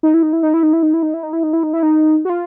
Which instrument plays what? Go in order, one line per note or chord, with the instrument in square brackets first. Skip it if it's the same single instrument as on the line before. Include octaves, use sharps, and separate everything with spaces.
[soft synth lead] D#4
E4
D#4
E4
D#4
E4
D#4
E4
D#4
E4
D#4
E4
D#4
E4
D#4
E4
D#4
E4
D#4
F#4
F4